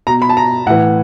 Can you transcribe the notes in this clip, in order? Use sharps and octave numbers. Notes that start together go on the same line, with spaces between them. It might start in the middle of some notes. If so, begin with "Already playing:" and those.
B2 A#5
B5
A5
A#5
A2 E3 F#5